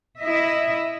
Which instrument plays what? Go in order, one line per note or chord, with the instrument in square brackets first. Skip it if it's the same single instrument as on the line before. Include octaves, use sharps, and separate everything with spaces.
[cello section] E4 D#5 E5